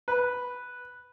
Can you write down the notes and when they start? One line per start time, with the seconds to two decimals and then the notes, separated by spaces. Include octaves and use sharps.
0.08 B4